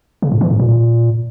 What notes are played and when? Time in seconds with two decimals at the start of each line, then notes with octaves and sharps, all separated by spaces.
0.22 C#3
0.32 G#2
0.41 E3
0.50 G#2
0.59 A#2